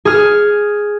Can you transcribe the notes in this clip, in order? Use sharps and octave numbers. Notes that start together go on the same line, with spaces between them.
G#4 F6